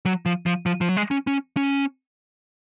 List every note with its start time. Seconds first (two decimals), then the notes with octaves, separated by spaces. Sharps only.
0.06 F#3
0.26 F3
0.46 F3
0.66 F3
0.81 F3
0.89 F#3
0.97 G#3
1.11 C#4
1.27 C#4
1.57 C#4